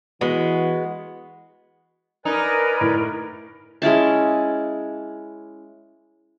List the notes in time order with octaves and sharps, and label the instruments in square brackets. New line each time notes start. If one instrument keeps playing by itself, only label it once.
[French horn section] E3 [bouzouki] G#3 B3 [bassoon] F#4
[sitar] D#4 [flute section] A#4 B5 [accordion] B4 D5 G#5
[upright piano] A2
[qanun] G#3 C#4 E4 A5